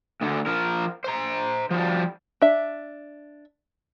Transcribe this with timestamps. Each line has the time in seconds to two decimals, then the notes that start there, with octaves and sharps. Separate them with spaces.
0.21 D2 D3
0.46 F3 A#4
1.04 C5 A#5
1.70 F3 G3
2.42 D4 E5